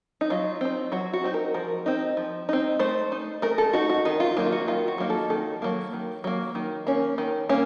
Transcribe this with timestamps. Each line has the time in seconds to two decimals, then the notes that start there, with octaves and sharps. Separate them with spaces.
0.21 D#4
0.30 F#3 F4
0.61 C4 D#4
0.92 F#3 F#4
1.13 F#4
1.24 C4 D#4
1.34 A#4
1.54 F3 A#4
1.86 C4 D#4
2.17 F3
2.49 C4 D#4
2.79 A3 C5
3.12 D#4
3.42 A3 A#4
3.58 A4
3.73 D#4 F#4
3.90 F#4
4.05 D#3 D#4
4.20 F4
4.37 F#3 A#3 D#4
4.46 F4
4.52 F#4
4.68 D#3 F4
4.88 F#4
4.98 F#3 A#3 D#4
5.10 A4
5.30 D#3 A4
5.62 F#3 A#3
5.93 D#3
6.24 F#3 A#3
6.55 D#3
6.87 A#3 C#4
7.18 D#3
7.49 A#3 C#4